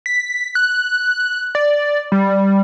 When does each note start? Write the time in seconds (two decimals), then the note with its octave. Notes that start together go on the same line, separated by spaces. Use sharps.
0.06 B6
0.55 F#6
1.55 D5
2.12 G3